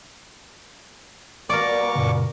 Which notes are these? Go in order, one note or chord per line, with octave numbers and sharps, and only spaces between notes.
B2 G3 A#3 A#4 D5 C#6 D6
F#2 A#2 C#3